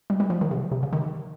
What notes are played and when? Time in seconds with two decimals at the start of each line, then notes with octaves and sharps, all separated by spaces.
0.10 G3
0.20 G3
0.30 F3
0.41 D#3
0.51 C3
0.72 C3
0.83 C#3
0.93 D#3